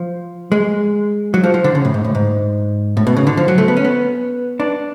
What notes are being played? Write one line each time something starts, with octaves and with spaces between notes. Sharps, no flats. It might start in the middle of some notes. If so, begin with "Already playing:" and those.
Already playing: F3
G#3
F#3
F3
F3
D3
C#3
A2
G#2
A2
G#2
A2
B2
C#3
D3
F3
F#3
A3
B3
C#4
B3
D4